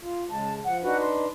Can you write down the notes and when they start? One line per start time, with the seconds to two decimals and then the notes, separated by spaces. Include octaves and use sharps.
0.03 F4
0.30 C#3 G#3 A5
0.64 F3 F#5
0.83 D4 D#4 F#4 B4
1.01 C6